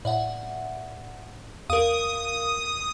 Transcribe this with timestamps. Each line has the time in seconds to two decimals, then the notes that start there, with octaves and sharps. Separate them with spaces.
0.05 A2 D5 E5 F#5
1.70 E2 A#4 F5 D#6